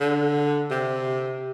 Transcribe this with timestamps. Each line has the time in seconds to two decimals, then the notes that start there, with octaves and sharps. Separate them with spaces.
0.01 D3
0.71 C3